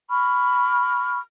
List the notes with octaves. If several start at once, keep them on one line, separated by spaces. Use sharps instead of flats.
B5 C#6 F6